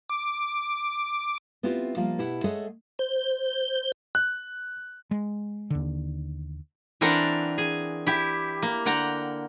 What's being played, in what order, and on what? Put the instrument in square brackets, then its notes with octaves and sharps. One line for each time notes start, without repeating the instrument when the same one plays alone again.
[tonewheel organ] D6
[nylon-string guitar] B3 C4 E4 F4 G4
F3 G3 A#3 F4
B2 E4 G4 F#5
G#3 A3 G#4 A4 C#5 F#5
[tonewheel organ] C5
[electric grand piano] F#6
[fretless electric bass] G#3
D#2 D3
[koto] E3 C4 D4 A4 A#4 F#5
G#4
E4 G4
A#3
D3 F#5 G5 A#5